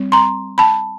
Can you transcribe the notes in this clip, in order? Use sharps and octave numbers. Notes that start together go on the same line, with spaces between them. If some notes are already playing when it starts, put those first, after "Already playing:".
Already playing: G3 C4
A#5 C6
A5 B5